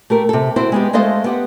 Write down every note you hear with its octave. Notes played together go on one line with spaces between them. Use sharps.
A3 G4 A#4
C3 A4
C4 E4 F#4 C5
G#3 B3 G4
G#3 A3 A4 C5 D#5 F5
B3 G4 F#5